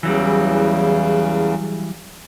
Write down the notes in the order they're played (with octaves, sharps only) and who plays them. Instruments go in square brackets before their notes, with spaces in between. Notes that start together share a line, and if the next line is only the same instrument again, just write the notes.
[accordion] E2 C#3 [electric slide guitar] E3 F#3 G3